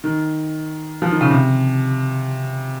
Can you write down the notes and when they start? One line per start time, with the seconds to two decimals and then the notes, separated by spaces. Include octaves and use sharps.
0.04 D#3
1.02 F3
1.11 D#3
1.21 C#3
1.30 C3